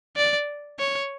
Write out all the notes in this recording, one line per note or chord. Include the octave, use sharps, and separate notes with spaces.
D5
C#5